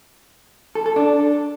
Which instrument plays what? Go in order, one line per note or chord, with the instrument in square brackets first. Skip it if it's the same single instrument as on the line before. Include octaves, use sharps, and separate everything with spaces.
[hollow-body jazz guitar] A4
A4
D4